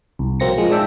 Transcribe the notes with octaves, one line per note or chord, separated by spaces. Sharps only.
C2
A#1 F#3 A#3 C4 A#6 C#7
F3 G#3
G#2 D4 D5 E5 G5 A5